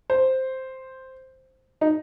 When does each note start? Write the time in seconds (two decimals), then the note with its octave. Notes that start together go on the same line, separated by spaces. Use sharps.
0.10 C5
1.81 D#4